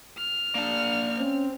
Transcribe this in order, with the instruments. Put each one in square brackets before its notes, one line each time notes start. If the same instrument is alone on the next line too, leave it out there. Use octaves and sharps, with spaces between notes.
[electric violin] F6
[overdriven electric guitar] A#3 A5 [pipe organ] D4
[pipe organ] C4 [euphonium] C#4